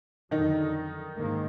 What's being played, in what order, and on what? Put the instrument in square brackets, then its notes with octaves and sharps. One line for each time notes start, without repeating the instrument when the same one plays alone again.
[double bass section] F2 D3 F#3 [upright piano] D#3 D#4
[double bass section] G#2 D#3 A#3